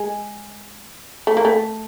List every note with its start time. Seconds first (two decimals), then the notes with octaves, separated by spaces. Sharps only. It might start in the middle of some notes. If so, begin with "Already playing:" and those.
Already playing: G#3
1.27 A3
1.37 A#3
1.45 A3